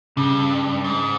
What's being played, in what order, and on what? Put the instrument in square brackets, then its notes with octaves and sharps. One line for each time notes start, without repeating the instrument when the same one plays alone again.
[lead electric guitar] G2 [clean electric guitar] C#3
[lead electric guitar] G#2